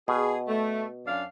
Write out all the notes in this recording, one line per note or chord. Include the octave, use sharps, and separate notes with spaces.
B2 G#4
A3
F#2 D4 F5